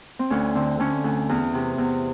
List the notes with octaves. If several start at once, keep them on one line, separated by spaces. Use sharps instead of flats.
C4
D2 C#4
D3 C4
D3 C#4
D2
E2
C3
E2